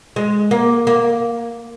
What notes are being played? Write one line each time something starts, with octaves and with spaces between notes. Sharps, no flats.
G#3
A#3
A#3